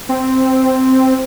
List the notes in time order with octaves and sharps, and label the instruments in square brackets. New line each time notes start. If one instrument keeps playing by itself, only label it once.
[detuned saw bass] C4